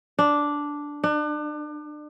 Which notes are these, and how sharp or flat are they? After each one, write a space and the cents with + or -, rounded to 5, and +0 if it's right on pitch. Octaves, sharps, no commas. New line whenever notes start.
D4 -5
D4 +35